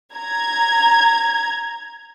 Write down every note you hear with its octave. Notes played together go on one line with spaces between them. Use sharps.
A#5 G#6